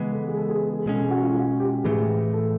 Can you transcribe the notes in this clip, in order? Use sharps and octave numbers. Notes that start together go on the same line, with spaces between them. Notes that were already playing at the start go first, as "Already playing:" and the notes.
Already playing: C#3 E3 G#3 B3
A4
G#4
A4
G#4
G#4
B2 G#3 C#4 A4
G#4
F#4
F4
F#4
G4
A2 E3 A3 G#4
A4